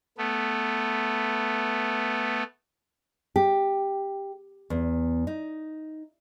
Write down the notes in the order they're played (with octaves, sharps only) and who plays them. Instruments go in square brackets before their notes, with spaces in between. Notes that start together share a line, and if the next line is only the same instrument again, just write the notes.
[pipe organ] A3 B3
[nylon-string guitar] G4
E2
D#4